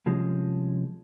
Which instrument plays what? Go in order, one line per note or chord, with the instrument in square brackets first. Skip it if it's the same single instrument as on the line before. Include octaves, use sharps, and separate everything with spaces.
[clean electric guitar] C2 F3 G#3 C#4